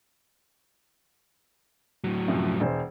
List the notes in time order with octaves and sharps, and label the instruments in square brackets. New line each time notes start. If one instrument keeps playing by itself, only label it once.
[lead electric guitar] A2 F#3
[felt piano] F#2 C3 F3
E1 E3 C5